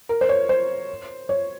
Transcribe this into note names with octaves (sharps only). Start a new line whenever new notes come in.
A#4
C5
C#5
C5
C#5